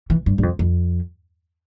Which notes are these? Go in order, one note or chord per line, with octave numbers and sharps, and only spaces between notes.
E3
G2
G2
F2
F2